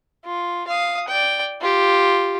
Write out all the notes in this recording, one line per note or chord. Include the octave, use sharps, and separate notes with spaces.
F4
F5 D#6
D5 G5
F4 G4